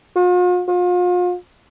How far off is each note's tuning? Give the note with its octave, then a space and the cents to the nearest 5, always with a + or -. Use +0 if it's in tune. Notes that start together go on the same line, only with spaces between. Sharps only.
F4 +45
F4 +40